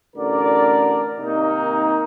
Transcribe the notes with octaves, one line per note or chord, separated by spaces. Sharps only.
A1 D3 A#4 D5
C3 D#3 A#3 D#4